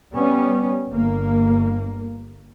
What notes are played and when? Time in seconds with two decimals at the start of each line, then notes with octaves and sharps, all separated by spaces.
0.14 G3 B3 C#4
0.90 G1 A#3